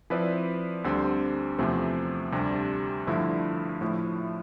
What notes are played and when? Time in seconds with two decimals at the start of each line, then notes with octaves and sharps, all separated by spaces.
0.10 F3 C4 E4 B4 D5
0.84 D2 D3 G3 C4
1.58 E2 C3 F3 A3 C4
2.32 D2 C3 G3 D4
3.07 G2 D3 F3 A3 E4
3.81 A2 F3 A3 E4